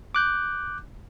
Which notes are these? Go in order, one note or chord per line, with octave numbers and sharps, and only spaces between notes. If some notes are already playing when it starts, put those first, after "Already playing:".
D6 F#6 G6